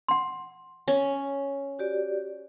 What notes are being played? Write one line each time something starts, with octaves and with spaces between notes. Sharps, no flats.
F#5 C6
C#4
F#4 G4 D5